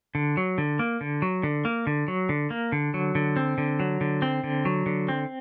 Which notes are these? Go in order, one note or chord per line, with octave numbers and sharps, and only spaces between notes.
D3
F#3
D3
A#3
D3
F#3
D3
A#3
D3
F#3
D3
A#3
D3
F#3
D3
C4
D3
F#3
D3
C4
D3
F#3
D3
C4